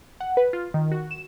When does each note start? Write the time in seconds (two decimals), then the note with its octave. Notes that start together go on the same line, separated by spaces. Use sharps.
0.20 F#5
0.37 B4
0.53 F4
0.74 D#3
0.91 F#4
1.11 E7